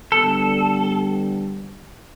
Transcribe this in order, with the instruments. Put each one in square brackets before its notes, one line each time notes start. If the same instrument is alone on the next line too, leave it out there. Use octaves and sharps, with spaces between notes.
[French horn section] D3 G3 B3 [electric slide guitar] A4